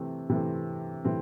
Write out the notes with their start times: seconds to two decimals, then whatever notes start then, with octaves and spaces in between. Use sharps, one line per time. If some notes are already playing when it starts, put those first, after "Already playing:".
Already playing: C3 E3 A3 C4
0.30 C3 E3 A3 C4
1.04 C3 E3 A3 C4